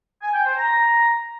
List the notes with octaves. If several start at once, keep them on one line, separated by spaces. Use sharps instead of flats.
G#5
G5
C5
A#5